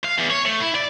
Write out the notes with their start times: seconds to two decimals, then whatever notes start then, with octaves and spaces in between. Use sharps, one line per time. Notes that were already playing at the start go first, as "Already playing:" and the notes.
0.04 F5
0.18 E2
0.30 C#5
0.45 A3
0.60 E4
0.75 D5